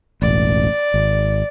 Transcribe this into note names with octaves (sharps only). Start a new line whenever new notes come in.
E1 A1 D5
G#1